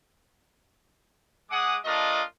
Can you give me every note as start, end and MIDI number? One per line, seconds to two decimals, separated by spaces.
1.50 1.77 56
1.50 1.77 68
1.50 1.77 78
1.50 1.77 86
1.50 1.77 87
1.85 2.22 57
1.85 2.22 62
1.85 2.22 65
1.85 2.22 70
1.85 2.22 75